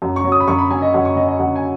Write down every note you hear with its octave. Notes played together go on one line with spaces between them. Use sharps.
F#2
C#6
F#3
D#6
B5
F#2 C#6
B5
F#3 G#5
D#5
F#2 F#5
C#6
F#3 D#5
D#5
F#2 F#5
G#5